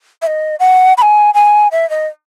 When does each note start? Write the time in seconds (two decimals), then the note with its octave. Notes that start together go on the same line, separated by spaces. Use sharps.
0.22 E5
0.27 D#5
0.60 F#5
0.97 B5
1.02 G#5
1.34 G#5
1.72 E5
1.90 D#5